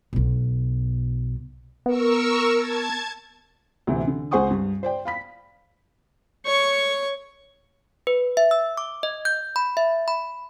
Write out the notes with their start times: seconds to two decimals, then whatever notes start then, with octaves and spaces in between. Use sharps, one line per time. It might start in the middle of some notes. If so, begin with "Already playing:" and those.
0.13 B1 B2
1.86 B3 A#4 C#6 E6
2.54 A5 G#6
3.87 D2 A2 C3 E3
4.08 D3
4.31 C#2 G#4 C5 F#5 C#6 D#6
4.50 G2
4.83 C5 D5 G5
5.05 F5 B5 B6
6.46 C#5 C#6
8.07 B4
8.37 E5
8.51 E6
8.77 D6
9.03 D#5
9.25 G6
9.56 B5
9.77 E5
10.08 B5